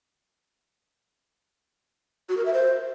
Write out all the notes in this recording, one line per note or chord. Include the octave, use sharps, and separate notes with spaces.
F#4
A#4
E5
C5